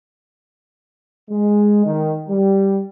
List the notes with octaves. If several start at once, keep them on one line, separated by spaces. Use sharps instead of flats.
G#3
D#3
G3